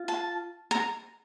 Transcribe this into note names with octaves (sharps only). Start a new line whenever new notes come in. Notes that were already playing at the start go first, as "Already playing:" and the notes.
Already playing: F4
A5
A#5